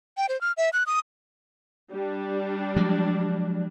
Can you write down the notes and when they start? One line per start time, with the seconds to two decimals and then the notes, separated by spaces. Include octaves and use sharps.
0.17 G5
0.29 C5
0.41 F6
0.57 E5
0.73 F#6
0.86 D#6
1.92 G3 D4
2.76 F3 F#3 G#3